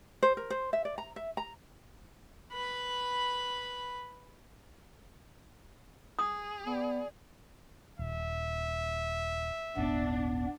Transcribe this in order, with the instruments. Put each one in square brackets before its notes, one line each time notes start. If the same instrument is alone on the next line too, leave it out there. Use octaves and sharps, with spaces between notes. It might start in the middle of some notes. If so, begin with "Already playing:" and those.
[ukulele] C5
A#4
C5
E5
D5
A#5
E5
A#5
[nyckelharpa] B4 B5
[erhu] G#4 [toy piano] D#6
[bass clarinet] B3 [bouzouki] D5
[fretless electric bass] D#1 [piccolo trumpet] E5
[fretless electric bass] D#1 G#1 [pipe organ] B3 [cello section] D4